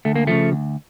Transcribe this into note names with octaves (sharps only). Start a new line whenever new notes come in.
D2 A3
A#3
C#3 F3 A3
D2